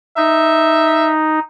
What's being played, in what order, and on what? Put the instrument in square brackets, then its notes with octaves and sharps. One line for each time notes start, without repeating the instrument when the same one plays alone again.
[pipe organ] D#4 [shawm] E5